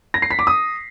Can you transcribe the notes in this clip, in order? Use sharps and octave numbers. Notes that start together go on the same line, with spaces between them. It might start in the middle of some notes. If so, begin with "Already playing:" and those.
A#6
C7
B6
D6
D#6